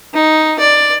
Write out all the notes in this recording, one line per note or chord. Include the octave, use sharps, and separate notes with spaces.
D#4
D5